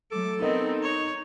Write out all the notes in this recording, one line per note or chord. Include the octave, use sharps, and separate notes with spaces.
F#3 A3 A4 D6
B3 C4 D#4 A#4 D#5
C#5